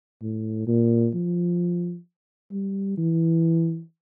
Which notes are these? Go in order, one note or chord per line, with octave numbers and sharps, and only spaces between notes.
A2
A#2
F3
G3
E3